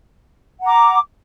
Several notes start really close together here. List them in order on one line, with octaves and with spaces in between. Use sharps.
F#5 A#5 D6